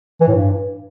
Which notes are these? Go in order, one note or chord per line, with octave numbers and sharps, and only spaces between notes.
E3
A2
G2